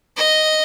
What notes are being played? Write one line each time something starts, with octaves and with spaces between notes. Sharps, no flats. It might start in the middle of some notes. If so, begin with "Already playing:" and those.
D#5